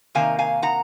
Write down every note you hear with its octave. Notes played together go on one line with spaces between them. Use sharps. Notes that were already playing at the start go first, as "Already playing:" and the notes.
C3 D#3 A#3 D#4 F5 G#5
F5 G#5
F#5 A#5